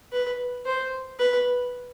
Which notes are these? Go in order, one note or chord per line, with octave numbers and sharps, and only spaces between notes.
B4
C5
B4